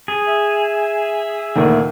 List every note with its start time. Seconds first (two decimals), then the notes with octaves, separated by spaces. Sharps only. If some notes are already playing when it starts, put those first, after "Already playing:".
0.08 G#4
0.27 E5
1.56 D2 A#2 D#3